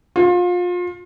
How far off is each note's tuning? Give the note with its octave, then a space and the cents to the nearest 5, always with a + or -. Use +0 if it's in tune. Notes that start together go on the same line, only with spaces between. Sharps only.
F4 +30